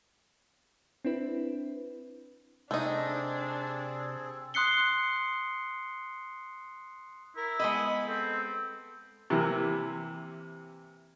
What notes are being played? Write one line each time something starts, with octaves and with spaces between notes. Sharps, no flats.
C4 D4 E4 B4
C3 A3 C4 D4 D#4 G#4 A4
C6 D#6 F#6 C7 C#7 G7
E4 A#4
G#3 B3 D#5 B5
C4 A4
C3 E3 A#3